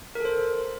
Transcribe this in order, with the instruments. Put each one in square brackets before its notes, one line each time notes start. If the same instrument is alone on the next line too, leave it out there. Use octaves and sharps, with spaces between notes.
[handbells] A#4
A4
C5